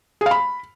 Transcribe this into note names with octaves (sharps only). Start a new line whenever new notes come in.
G#4
F5
B5